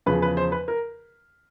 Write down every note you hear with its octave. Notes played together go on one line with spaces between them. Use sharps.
E2 C#3 F3 B4
B4
C5
B4
A#4